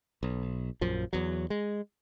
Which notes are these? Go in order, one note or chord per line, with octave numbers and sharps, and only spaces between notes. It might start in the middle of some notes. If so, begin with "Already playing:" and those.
B1
A#1 F#2 F3
E2 F#3
G#3